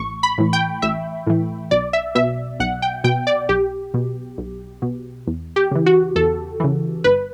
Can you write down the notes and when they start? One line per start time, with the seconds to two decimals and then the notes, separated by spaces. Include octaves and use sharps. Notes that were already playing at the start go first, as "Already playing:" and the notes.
Already playing: A1 C#6
0.23 B5
0.38 A2 E3
0.53 G5
0.82 A1 E5
1.27 A2 E3
1.71 B1 D5
1.93 E5
2.15 B2 E5
2.60 B1 F#5
2.82 G5
3.04 B2 G5
3.27 D5
3.49 B1 G4
3.94 B2
4.38 B1
4.82 B2
5.27 E2
5.56 G4
5.71 C#3 E3
5.86 F#4
6.16 E2 A4
6.60 C#3 E3
7.04 G1 B4